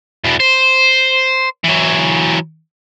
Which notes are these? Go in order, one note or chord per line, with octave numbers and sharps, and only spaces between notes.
E2 B2
C5
E3 F#3